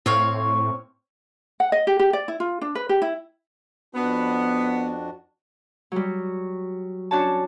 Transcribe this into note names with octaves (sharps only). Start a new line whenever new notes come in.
A2 C4 C#5 F5
F#5
D#5
G4
G4
D5
E4
F4
D4
B4
G4
E4
F2 B3 D4 F#4
F#3 G3
C#4 D4 F#4 C#5 A5